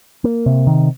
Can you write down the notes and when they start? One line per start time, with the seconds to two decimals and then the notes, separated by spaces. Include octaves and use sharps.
0.24 A#3
0.46 C3
0.67 D#3